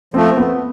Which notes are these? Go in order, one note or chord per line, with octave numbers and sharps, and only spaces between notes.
F3 A3 C4
B3